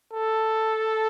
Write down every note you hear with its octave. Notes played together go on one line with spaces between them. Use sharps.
A4